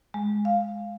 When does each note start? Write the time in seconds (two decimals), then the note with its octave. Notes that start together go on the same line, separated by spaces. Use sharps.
0.14 G#3
0.45 F5